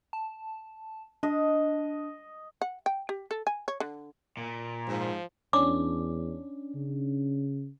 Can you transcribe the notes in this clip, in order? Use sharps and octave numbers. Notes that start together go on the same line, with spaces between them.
A5
D4 D#5
F#5
G5
G4
A4
G#5
C#5
D3
A#2
G#2 F3
E2 C#4 D4 D6
C#3